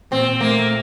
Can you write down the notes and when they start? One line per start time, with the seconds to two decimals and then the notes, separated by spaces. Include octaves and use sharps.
0.11 A#2 C4
0.40 A3 A#3